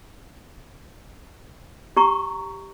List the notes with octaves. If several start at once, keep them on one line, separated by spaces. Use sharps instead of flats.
G4 A#5 C#6